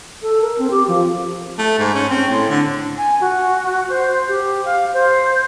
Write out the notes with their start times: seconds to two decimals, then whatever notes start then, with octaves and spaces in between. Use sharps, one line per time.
0.22 A4
0.41 A#4
0.58 C4
0.71 G4
0.88 F3
1.58 A3
1.79 G#2
1.94 C#4
2.10 C4
2.29 A2
2.49 D3
2.98 G#5
3.21 F#4
3.89 C5
4.28 G4
4.65 F5
4.94 C5